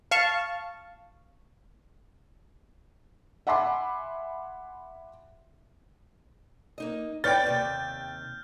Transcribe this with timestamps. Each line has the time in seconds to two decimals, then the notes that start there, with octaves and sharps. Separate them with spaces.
0.11 F5 A5 C#6
3.47 E5 F#5 G#5 B5 C6 D6
6.78 A#3 D#4 D#5
7.24 B4 C#5 D5 G5 F6 G6 A6
7.47 D#2 C3